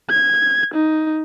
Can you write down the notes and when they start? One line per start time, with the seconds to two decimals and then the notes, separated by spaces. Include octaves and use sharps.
0.10 G#6
0.74 D#4